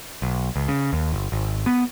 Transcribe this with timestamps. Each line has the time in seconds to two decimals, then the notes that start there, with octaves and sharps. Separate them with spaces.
0.22 B1
0.56 C#2
0.68 C#3
0.93 D#2
1.13 G1
1.32 G#1
1.66 B3